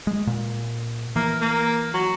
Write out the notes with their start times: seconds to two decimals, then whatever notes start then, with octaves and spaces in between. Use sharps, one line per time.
0.07 G#3
0.27 A#2
1.16 E3 A#3
1.41 A#3
1.94 F#3